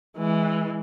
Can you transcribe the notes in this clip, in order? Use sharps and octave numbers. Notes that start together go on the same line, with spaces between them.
E3 G#3